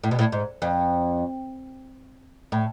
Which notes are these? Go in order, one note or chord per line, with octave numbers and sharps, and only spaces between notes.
A2
B2
A2
G#2
F2
A2